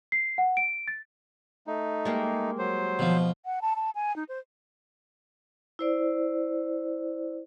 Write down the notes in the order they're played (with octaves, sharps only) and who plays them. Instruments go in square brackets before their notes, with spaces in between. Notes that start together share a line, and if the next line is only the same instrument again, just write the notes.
[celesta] C7
F#5
D7
A6
[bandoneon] A3 D#4
[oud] G3 G#3 A#3
[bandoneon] F#3 C5
[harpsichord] B2 F3
[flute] F#5
A5
A5
G#5
D#4
C5
[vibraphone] E4 C5 D5